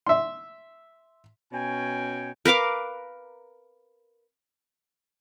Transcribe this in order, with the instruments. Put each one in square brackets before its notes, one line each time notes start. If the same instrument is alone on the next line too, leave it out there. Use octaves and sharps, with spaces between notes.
[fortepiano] E5 C6
[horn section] B2 C#4 G5 G#5
[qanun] A#4 B4 F5 D6